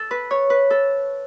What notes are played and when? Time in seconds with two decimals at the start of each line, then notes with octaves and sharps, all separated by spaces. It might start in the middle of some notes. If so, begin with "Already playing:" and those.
Already playing: A4
0.11 B4
0.31 C#5
0.50 B4
0.70 A4